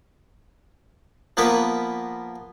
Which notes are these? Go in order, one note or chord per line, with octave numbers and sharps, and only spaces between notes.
F3 A#3 B3 A#4 B4